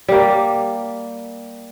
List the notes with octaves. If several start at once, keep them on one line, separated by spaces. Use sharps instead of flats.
G3 A#3